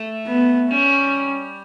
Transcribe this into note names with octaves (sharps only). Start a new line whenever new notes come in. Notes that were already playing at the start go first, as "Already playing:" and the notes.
Already playing: A3
B3
G3 C#4